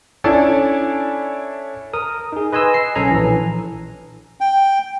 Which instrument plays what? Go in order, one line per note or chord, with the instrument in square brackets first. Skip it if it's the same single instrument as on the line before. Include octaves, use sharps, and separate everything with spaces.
[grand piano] C#4 D4 E4 A4 D5 G#5
[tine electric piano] A#4 D#6
D#4 G#4
B4 D#5 G#5 C6 E6
C7
B1 C#4 A4 G#5 A#5
A#1 E3
[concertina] G5